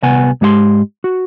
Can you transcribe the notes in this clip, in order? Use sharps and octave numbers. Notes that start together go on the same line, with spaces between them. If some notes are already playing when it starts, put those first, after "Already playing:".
C2 C3 B3 F#5 G#5
G#2 G#3 G4 E5 C6
F#4